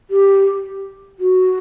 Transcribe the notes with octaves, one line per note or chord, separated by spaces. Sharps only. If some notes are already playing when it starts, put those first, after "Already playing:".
G4
F#4